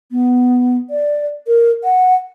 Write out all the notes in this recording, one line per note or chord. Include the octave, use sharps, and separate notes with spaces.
B3
D5
A#4
F#5